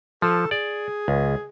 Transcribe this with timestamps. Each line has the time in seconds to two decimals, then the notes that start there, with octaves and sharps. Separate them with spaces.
0.22 F3 A4
0.51 G#4 D5
1.08 C#2